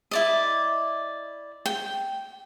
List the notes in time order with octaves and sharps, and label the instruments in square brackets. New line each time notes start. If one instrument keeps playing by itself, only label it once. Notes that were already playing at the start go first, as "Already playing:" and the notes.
[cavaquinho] E4 D5 D#5
G5